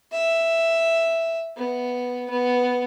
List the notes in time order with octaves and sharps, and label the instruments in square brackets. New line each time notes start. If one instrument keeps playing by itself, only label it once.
[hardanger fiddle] E5
B3
B3